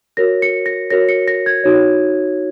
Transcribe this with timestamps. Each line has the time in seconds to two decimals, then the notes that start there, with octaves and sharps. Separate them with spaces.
0.17 F#4 A#4 C#5 A#6
0.42 C#7
0.66 A#6
0.90 F#4 A#4 C#5 A#6
1.09 C#7
1.28 A#6
1.46 G#6
1.64 D#4 F#4 C#5